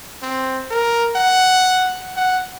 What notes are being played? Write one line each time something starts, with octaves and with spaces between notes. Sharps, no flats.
C4
A#4
F#5
F#5